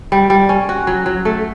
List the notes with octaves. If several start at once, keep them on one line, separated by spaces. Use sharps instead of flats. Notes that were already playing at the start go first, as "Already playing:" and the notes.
G3
G3
C#4
F#4
F#3
F#3
A3